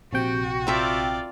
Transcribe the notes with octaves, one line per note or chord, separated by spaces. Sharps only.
A#1 C3 F#4 G5
C4 F4 A#4 D5 E5